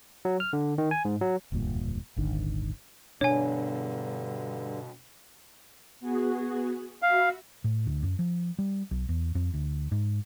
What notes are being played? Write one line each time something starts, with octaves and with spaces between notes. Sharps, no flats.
F#3
F6
D3
D#3
G#5
G#2
F#3
E1 D2 G2 A#2
D#1 G#1 D3 D#3
G2 B2 D3 D4 C#5 G#5
B3 F#4 G#4
F#4 E5 F5 B5
A2
D2
F#2
F3
G3
B1
E2
F2
D2
G#2